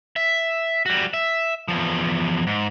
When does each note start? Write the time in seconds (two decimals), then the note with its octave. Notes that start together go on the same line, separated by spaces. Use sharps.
0.16 E5
0.86 G3 F#4
1.14 E5
1.68 E2 F3
2.47 G#2